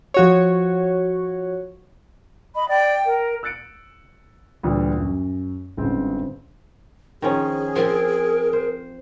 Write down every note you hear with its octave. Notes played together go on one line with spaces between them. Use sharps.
F3 F#4 C#5
D#5 B5
D5 G5
A#4
E6 F#6 A6 C#7 D7
D2 A#2 E3 G3
F#2
G1 G#2 C#3 C4 C5
D#3 F3 C#4 G#4
F3 C4 A#4
C5